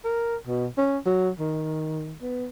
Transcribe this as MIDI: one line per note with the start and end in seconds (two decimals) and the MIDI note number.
0.05 0.36 70
0.47 0.67 47
0.78 0.98 61
1.06 1.30 54
1.39 2.15 51
2.22 2.49 59